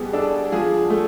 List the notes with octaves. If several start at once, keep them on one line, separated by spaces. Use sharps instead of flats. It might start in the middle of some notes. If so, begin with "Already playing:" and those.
Already playing: B2 G3 B3 G4 G#4
D4 A4
F3 G#4
A3